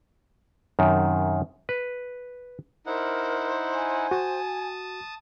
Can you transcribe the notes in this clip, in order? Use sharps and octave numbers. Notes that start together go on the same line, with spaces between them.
F#2 C3 D#3
B4
D#4 E4 A#4 C5 F#5
G#5
F#4 A5 D#6